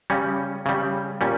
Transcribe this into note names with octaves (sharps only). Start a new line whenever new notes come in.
C#3 G3 C#4
C#3 G3
A#2 G3 C#4